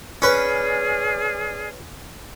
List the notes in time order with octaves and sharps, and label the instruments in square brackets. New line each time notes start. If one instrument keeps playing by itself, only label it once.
[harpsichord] C#4 B4 [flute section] G#4 D5 F6